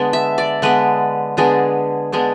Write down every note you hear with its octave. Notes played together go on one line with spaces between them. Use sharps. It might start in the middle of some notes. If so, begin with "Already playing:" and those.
Already playing: D3 G#3 B3 D4
E5
D5
D3 G#3 B3 D4 B4
D3 G#3 B3 D4 G#4
D3 G#3 B3 D4